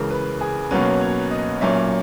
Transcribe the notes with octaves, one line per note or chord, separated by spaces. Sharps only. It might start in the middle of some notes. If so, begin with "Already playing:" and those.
Already playing: C#2 C#3 E3 A#4
B4
G#4
B1 B2 F#3 A#3 C#4 B4
C#5
D#5
B1 A#2 A#3 C#4 E5